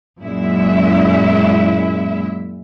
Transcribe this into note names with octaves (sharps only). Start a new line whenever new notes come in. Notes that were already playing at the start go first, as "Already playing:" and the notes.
F#2 A#2 G#3 E4 E5